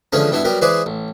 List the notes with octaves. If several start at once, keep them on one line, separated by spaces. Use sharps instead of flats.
D3 E3 F3 G#3 C#4
G2 B2 D4 E4
F#3 G3 B3 A#4
E3 G#3 G#4 B4 C5 D5
A1